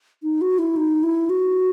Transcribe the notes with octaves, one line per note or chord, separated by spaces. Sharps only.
D#4
F#4
E4
D#4
E4
F#4